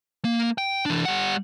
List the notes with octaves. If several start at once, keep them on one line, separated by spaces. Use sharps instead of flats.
A#3
G5
E3 D4
G3 F#5